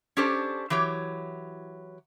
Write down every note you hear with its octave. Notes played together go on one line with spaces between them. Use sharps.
C#4 D4 G4 A4 C5
E3 F#3 G4 C#5